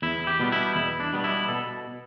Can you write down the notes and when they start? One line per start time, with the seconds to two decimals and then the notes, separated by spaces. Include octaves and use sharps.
0.02 E2 E4
0.27 G4
0.40 B2 G3 B3
0.52 E4
0.76 E2 E4
1.00 D4
1.13 B2 G3 B3
1.24 E4
1.48 B2 A4